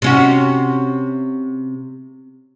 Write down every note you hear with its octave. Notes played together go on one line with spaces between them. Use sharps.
C3 C#4 F#4